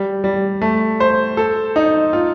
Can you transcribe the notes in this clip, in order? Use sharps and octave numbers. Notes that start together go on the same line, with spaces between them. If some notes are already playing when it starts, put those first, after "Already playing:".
Already playing: G3
G3
A3
C5
A4
D#4
F4